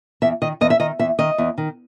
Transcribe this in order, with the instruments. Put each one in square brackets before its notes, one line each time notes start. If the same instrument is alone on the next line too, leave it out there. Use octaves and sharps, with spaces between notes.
[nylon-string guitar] E2 E5
D#3 D#5
E2 D#5
E5
D#3 D#5
E2 E5
D#3 D#5
E2
D#3